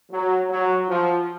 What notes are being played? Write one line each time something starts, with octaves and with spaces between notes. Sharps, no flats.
F#3
F#3
F3